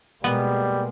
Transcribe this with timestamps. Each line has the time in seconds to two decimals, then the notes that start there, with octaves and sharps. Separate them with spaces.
0.24 B2 G3 G#3 A#3 B3